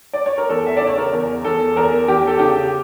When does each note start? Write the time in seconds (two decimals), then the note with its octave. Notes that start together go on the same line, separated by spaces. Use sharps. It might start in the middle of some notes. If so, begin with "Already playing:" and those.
0.13 D5
0.26 C#5
0.38 A#4
0.49 E2 A4
0.66 E5
0.77 C#3 D5
0.87 C#5
0.98 A#4
1.13 E2
1.45 E2 A4
1.76 E2 A#4
2.07 E2 G4
2.27 A4
2.39 C#3 G4